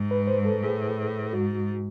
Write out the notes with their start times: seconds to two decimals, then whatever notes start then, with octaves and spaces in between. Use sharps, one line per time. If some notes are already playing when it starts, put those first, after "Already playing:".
Already playing: G#2
0.11 B4
0.27 C5
0.45 A4
0.63 A2 G#4
1.33 G#2 F#4